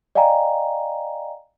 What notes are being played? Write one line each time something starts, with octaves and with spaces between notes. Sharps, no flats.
D5 D#5 F5 G5 G#5 A#5